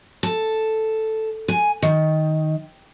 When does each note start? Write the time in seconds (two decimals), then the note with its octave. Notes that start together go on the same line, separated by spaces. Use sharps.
0.23 A4
1.48 G#5
1.82 D#3